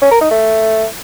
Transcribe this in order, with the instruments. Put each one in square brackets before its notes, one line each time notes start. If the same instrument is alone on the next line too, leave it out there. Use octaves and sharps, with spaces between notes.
[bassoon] C#4
A#4
D#4
A3